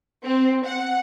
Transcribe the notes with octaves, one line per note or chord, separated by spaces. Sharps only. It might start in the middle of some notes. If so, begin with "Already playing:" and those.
C4
F#5